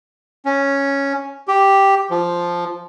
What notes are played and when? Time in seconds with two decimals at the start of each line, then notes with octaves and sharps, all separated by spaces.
0.45 C#4
1.48 G4
2.10 F3